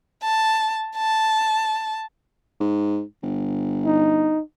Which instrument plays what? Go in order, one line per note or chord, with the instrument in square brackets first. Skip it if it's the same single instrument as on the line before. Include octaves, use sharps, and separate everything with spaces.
[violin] A5
A5
[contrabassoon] G#2
G1
[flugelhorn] D#4